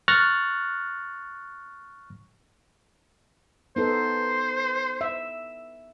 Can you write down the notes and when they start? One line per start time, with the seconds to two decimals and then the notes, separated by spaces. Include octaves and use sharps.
0.08 C#6 F6 F#6 A6 A#6
3.76 B3 D#4 A4 C5
5.01 E5